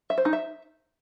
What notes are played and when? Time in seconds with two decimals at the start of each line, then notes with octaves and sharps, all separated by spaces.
0.10 E5
0.18 C5
0.25 D#4
0.33 E5